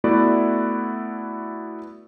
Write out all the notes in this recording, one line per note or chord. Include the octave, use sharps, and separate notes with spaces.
A3 B3 E4 F#4 D5